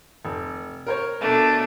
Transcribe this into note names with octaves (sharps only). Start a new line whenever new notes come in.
F1
A#4 C5 C#5
B2 A3 D4